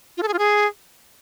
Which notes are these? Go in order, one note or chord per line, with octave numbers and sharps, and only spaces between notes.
F4
A4
G#4
F4
G#4